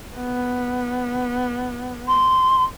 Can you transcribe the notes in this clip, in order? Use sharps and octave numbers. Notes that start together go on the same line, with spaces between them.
B3
C6